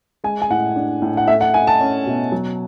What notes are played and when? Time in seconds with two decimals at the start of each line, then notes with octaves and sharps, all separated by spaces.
0.24 G#3 G#5
0.42 G#5
0.50 A2 F#5
0.76 D4
1.02 A2
1.17 F#5
1.28 A3 E5
1.41 F#5
1.54 E4 G#5
1.67 A5
1.81 C#4
2.06 B2
2.32 F#3